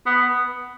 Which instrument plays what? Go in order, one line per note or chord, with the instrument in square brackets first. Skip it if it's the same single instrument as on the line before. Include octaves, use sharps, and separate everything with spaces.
[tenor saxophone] B3